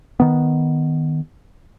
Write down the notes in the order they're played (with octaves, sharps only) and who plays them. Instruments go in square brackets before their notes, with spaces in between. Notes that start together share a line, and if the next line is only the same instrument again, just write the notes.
[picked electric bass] D#3 B3